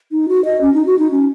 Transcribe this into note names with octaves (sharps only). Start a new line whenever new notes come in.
D#4
F#4
D#5
C#4
D#4
F#4
D#4
C#4